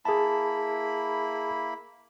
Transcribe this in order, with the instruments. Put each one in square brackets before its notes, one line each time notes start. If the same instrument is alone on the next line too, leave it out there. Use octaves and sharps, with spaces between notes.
[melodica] A#3 E4 B5 [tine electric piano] G#4 A5